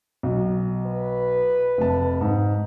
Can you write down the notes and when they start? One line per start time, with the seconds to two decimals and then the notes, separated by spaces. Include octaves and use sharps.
0.23 B1
0.86 B4
1.78 F1 A5
2.21 G#2